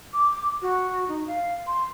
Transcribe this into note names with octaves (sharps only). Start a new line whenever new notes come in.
D6
F#4
D#4
F5
C6